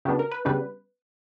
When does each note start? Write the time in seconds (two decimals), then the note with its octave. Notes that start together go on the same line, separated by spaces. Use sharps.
0.05 C#3 F#3 B3 D4 G4
0.19 A#4
0.31 B4
0.45 C#3 G3 B3 D4 B4